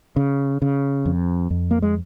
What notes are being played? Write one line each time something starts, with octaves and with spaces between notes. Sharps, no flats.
C#3
C#3
F2
F2
A#3
G#3